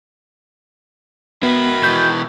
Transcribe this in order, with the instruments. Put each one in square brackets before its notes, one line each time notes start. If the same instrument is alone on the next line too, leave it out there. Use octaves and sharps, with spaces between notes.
[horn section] D#3 B5 [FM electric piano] B3 [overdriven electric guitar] F#4 E5
[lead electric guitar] B2 E3 [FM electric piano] G6